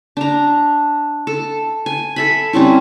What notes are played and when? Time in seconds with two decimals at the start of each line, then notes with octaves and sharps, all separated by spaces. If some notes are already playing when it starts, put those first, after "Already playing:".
0.17 D4 A#5
1.27 A4
1.86 G#5
2.16 A4 E5 B5
2.53 G3 C4 C#4 E4